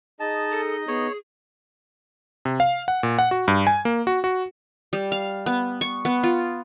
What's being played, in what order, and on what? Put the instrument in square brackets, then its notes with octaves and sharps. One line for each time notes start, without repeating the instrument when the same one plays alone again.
[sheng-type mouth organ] D#4 D#5 [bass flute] G#4 [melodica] A5
[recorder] A4
[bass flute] B3 [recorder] G#4 [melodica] C#5
[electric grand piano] C3
F5
F#5
A#2
F#5
F#4
G2
G#5
A#3
F#4
F#4
[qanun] G3
F5
B3
C#6
B3
F4